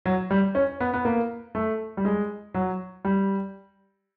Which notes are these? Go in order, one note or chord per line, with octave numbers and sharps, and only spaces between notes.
F#3
G3
C#4
B3
B3
A#3
A3
G3
G#3
F#3
G3